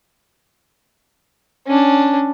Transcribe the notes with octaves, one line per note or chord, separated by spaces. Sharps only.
C#4 D4